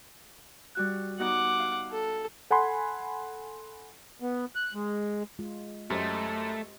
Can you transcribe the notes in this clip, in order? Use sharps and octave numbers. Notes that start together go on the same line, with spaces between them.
G3 F#4 F#6
B3 D#4 F#4 F#5 D6
F5
A4
A4 F#5 G#5 B5 C6
B3
F#6
G#3
G#3 F4
F#2 A3 G4 C5 D#5